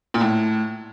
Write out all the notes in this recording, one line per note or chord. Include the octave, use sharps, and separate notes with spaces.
A#2
A2